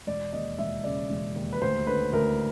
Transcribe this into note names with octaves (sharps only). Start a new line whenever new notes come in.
E1 D5
D#2 D#5
E1 E5
C#3 D5
E1
D#2
B4
D2 C5
D3 B4
D2 A#4